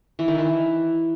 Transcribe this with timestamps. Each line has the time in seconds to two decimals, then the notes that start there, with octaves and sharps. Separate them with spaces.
0.19 E3
0.28 D#3
0.38 E3